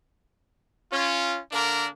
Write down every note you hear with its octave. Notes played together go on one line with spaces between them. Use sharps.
C#4 F4
D3 A#3 D4 A#4